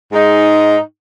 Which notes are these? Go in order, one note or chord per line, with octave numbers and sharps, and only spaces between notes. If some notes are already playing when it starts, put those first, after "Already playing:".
G#2 G#3 D#4